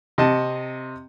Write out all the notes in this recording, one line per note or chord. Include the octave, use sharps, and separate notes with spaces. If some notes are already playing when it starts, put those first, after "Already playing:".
C3 D#5 A5